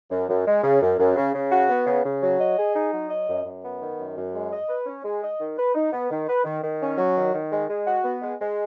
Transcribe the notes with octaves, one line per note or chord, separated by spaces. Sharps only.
F#2
F#2
G#3
C#3
F#2
F#2
C#3
C#3
F#4
B3
C#3
C#3
F#3
D#5
G#4
D#4
F#3
D#5
F#2
F#2
B3
D#3
F#2
F#2
G#3
D#5
B4
C#4
G#3
D#5
D#3
B4
D#4
B3
D#3
B4
D#3
D#3
C#4
F#3
D#3
D#3
G#3
G#3
F#4
B3
G#3
G#3